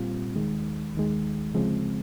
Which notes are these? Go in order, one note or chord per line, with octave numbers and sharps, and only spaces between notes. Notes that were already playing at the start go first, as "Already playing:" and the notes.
Already playing: A#2 G3 C4 F4
D#2 D#3 G#3
D#2 D#3 G#3
D2 C#3 F3 G#3 C4